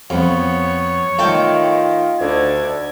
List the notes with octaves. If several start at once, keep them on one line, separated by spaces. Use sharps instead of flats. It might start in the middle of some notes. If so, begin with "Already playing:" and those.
F2 B3 C#5
D#3 A3 F4 D5 G5
D2 D3 G#6